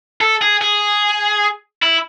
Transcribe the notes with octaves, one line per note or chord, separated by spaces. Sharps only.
A4
G#4
G#4
E4